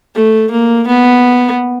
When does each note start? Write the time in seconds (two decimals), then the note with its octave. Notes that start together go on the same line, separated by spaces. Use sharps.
0.15 A3
0.51 A#3
0.87 B3